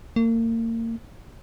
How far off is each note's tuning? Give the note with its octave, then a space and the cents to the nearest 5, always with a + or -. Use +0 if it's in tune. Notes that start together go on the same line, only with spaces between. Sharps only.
A#3 -35